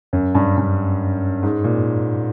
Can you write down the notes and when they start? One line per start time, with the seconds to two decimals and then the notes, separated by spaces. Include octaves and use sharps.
0.13 F#2
0.35 G2
0.57 G2
1.43 G#2
1.64 A#2